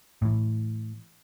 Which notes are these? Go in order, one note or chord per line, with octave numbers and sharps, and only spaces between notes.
A2 E3